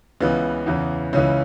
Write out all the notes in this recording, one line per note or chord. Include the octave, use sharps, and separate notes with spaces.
C#2 C#3 E3 B3
E2 C#3 E3
C#2 C#3 E3 C#4